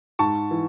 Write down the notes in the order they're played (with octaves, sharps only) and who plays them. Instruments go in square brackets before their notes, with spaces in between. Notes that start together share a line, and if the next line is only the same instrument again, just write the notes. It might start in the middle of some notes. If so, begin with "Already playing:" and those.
[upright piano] G#2 A5 C#6
E3